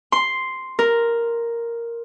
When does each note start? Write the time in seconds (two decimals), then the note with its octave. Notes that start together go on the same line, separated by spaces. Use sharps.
0.12 C6
0.79 A#4